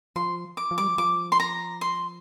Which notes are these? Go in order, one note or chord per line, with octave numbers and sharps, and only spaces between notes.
F3 C6
D6
F3
G3 D6
F3
F3 D6
C6
A#5
C6